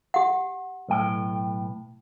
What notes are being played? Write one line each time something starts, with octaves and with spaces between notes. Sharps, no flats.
G4 F#5
B1 A2 G5